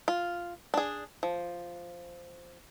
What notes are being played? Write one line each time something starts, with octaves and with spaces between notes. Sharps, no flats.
F4
D4 G#4
F3